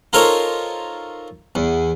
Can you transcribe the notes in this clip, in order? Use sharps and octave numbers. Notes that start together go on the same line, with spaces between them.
D#4 F4 A4 A#4 C5 C#5
E2